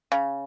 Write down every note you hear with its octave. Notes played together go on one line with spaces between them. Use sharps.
C#3